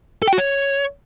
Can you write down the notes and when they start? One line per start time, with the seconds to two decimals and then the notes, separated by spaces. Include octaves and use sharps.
0.22 A4
0.28 G5
0.33 F#4
0.38 C#5